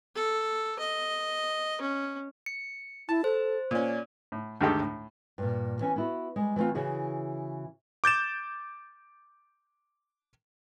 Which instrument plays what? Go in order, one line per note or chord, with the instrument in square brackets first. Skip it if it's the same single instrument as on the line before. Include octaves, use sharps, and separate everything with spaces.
[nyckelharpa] A4
D#5
C#4
[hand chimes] C#7
[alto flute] E4 [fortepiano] A5
[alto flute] A4 [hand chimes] C5
[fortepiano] A#2 C#4 [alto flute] D5
[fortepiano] A2
D2 G2 D#3 G#3 G4 A4
A2
[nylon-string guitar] G2 A#2
E3 C#4 G#5
B3 E4 F#4
G3 G#3
E3 G3 A3 C4 F4
C#3 E3 F#4 G#4
[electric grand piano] D6 G6 A6 E7